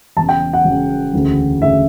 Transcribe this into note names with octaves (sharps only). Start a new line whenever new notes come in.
E1 E2 C#3 A5
G5
F#5
E1 E2 C#3
E1 D2 C#3
D2 C#3 E5